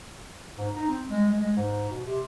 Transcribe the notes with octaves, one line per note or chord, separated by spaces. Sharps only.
G#2
D#4
C4
G#3
G#3
G#3
G#2
B2
C3